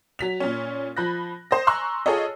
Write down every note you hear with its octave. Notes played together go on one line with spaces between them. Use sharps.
F#3 B6 F7
A#2 C#4
F3 B5 F#6 A#6
C5 D#6 A#6
G#5 A#5 C6 C#6 E6 F#6
F4 G#4 A4 C#5 D#5